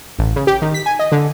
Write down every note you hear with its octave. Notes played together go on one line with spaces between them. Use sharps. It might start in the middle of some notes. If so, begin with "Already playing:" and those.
A1
C#3
G4
D#3
B6
G#5
D#5
D3